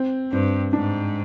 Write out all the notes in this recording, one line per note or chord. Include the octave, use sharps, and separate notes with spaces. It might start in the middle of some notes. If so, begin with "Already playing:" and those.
Already playing: C4
G2 C4
G#2 D4